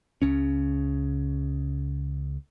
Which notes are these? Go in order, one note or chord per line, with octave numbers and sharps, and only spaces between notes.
C#2 C#3 C#4